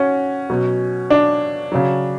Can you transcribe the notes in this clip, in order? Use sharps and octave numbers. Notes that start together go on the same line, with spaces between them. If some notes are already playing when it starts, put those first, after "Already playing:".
Already playing: C#4 F#4
B2 F#3
D4
C#3 F#3